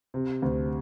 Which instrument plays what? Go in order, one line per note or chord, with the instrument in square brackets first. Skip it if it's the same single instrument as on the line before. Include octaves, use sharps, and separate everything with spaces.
[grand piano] C3
D2